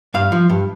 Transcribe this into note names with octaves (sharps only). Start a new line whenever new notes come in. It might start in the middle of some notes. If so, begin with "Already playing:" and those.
G2 F5
F3
G2